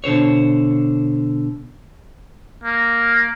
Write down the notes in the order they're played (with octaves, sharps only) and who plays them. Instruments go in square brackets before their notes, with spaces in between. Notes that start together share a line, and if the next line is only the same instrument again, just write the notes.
[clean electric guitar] B2 D3 C5 C#5
[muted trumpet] A#3